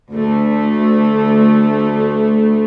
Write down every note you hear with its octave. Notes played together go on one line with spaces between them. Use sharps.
D2 A3